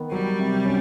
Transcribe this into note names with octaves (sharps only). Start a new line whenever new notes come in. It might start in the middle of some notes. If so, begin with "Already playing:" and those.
Already playing: D#3 B3
F#3 G3
C3
C#4